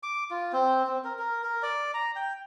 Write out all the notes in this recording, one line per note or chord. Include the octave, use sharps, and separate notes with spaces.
D6
F4
C4
C4
A#4
A#4
A#4
D5
A#5
G5